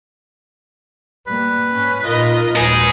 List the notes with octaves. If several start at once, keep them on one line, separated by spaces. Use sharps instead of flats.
G3 A#3 B4
G#2 C#4
A#2 D#4 F4 A#4 D#5
A#1 D#2 F#3 D#4 G#4 B4